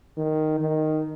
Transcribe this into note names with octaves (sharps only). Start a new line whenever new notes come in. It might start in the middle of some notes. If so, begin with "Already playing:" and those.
D#3
D#3